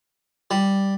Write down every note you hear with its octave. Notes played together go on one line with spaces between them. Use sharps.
G3